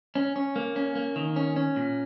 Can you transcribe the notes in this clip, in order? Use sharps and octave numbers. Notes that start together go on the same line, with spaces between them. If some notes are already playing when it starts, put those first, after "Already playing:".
C#4
C#4
A#3
C#4
A#3
D#3
C#4
C#4
A#2